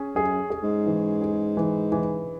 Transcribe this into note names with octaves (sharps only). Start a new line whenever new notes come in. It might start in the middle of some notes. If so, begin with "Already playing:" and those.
Already playing: C#4 G#4
F#2 G#4
G#4
G#2
E3
G#4
E3
E3